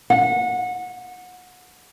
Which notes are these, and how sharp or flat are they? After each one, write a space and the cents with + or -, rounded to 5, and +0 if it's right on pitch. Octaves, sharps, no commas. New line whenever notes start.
F#5 -25